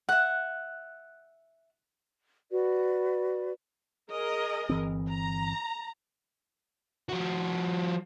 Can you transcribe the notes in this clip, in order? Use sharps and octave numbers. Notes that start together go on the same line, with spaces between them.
E5 F#5 F#6
F#4 B4 D5
G#4 A#4 D#5
G1 E3 C4
A#5
F3 F#4